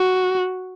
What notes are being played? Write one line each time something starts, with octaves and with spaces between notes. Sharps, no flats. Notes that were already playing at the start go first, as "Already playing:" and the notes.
Already playing: F#4